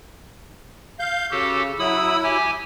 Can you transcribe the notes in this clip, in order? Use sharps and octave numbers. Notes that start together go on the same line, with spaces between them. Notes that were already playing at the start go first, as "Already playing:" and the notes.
F5 G6
C#3 F#4 G4 A4
F#3 E4 B5 D#6 E6
G4 G#5